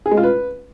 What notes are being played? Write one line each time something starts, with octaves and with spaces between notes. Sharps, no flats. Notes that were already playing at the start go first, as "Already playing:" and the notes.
G#4
G#3
F4
B4